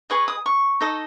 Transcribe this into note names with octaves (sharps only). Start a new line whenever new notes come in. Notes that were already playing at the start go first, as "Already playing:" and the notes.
G#4 B4 D#5 C#6
D#6
C#6
D#4 A4 D#5